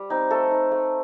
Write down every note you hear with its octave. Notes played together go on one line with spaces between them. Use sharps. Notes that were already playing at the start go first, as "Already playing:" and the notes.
Already playing: G3
C4 D#4
A3 A4
D#4
A3